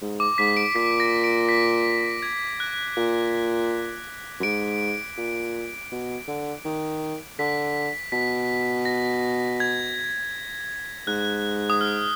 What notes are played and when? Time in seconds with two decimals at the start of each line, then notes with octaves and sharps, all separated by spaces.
0.02 G#2
0.20 D6
0.38 G#2 B6
0.57 D7
0.75 A#2 B6
1.00 A#6
1.24 D7
1.49 B6
2.22 G#6
2.60 F#6
2.97 A#2
4.40 F#2
4.43 G#2 D7
5.17 A#2
5.92 B2
6.28 D3
6.65 D#3
7.39 D3 B6
8.12 B2 B6
8.85 A#6
9.60 G#6
11.07 G#2 F#6
11.70 D#6
11.81 F6